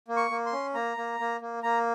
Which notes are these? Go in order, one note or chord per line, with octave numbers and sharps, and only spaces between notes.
A#3
C#6
A#3
C6
C#4
A#3 A#5
A#3
A#3
A#3
A#3 A#5